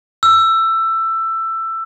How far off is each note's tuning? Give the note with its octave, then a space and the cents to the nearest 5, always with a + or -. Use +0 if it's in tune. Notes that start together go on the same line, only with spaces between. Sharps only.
E6 +15